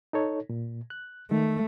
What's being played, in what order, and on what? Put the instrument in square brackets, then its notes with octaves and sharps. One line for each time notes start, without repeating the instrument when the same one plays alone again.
[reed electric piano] D#4 A4 C#5
A#2
F#6
[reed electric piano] D#3 [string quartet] A3